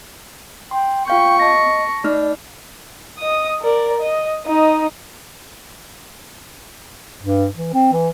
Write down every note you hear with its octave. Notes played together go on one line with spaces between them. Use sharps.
G5 C6
F4 F5 G5 C#6 G6
D#5 A5 A#6
A3 D#4 D5 F6
D#5 D#6
A#4 D5
D#5
D#4 D#5
G2
E3
C4
E3